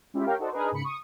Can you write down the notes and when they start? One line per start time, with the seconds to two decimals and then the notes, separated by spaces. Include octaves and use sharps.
0.14 G#3 C#4 E4 F4 G4
0.26 G4 A#4 C#5 F5 G5
0.39 D#4 F#4 A4 C5 D5
0.52 D4 D#4 G#4 A#4 B4
0.72 G#2 C#3 B5 C#7
0.84 C#6 D#6